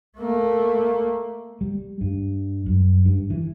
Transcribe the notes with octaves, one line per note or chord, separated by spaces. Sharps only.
A3 A#3
G3
G2
F#2
G2
E3